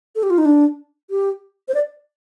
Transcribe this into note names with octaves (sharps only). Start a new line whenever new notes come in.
A4
G4
F4
D#4
D4
G4
C5
D5